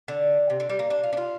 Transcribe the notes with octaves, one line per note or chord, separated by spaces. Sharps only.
D3
C3
D3
G3
A#3
D4
F4
D4
F4